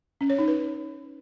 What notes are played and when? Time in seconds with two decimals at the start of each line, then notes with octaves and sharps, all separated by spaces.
0.21 C#4
0.30 C#5
0.39 D#4
0.48 B4